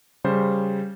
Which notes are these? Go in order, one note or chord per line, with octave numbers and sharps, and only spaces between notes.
C#3 G3 C5